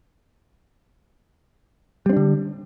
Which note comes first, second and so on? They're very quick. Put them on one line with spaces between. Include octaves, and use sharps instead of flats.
G3 C4 D4 D3